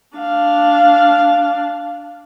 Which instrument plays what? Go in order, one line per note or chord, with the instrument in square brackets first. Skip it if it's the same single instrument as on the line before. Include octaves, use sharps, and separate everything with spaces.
[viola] D4 F5